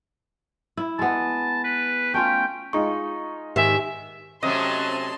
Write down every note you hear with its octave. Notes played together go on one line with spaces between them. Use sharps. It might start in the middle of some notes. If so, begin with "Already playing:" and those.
E4
G#3 B3 A5
B4
A3 C#4 F4 G5
G#3 D#4 F4 C#6
G#2 D#3 G4 E5 G#5
C3 F#3 A3 C#4 D#5 A5 C6